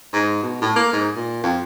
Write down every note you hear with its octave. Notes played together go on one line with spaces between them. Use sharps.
G#2
B2
A2
A#3
G#2
A#2
F2